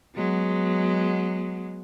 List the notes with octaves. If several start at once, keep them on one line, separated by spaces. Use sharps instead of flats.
F#3 G#3 B3